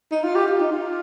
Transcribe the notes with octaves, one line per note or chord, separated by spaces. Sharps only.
D#4
F4
G4
F4
D#4
F4